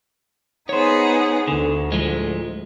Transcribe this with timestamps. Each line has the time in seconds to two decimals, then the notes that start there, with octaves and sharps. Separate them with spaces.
0.69 B3 D#4 G#4 C5 C#5
1.48 D2 D3
1.92 A2 F3 G#3